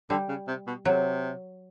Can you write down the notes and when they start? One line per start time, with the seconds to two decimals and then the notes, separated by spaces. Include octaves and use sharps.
0.10 D3 G3
0.29 C#3
0.48 C3
0.67 B2
0.85 C3 F#3